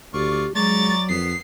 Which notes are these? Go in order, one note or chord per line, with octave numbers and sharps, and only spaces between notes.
D2 F4 G4 D5 C#6
F#3 G#3 D5 A#5 C#6 A6
F2 B3 C7